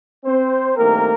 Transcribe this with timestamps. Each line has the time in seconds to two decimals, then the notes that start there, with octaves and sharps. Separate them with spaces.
0.24 C4 C5
0.76 G2 D#3 A3 A#3 C4 A#4